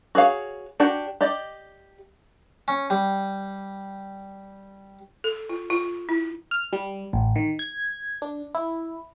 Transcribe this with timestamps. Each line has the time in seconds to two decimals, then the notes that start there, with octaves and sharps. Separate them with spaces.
0.15 F#4 G#4 C#5 F5
0.80 D4 F#4 G4 F#5 G5
1.21 G4 D5 D#5
2.68 C#4
2.90 G3
5.24 A4
5.49 F4
5.70 F4
6.09 E4
6.51 F6
6.73 G3
7.13 A1
7.36 D#3
7.59 G#6
8.22 D4
8.55 E4